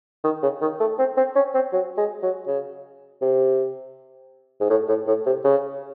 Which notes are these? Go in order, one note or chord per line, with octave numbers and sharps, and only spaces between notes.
D#3
C#3
D#3
A3
C4
C4
C#4
C4
F#3
G#3
F#3
C#3
C3
G#2
A2
A2
A2
C3
C#3